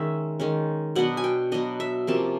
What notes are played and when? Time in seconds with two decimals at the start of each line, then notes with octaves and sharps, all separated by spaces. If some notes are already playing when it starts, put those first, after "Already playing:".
Already playing: D#3 G#3 C#4 E5
0.40 D#3 G#3 C#4
0.95 B2 F#3 B3 D4 F#5
1.17 G#5
1.24 G5
1.52 B2 F#3 B3 D4 D#5
1.80 E5
2.07 C3 F3 A#3 C#4 A5